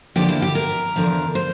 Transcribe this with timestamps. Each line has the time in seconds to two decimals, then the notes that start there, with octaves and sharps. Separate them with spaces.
0.16 E2 D3 F3 A#3 G4
0.29 E4
0.42 G4
0.55 A#4
0.96 E2 D3 F3
1.35 C5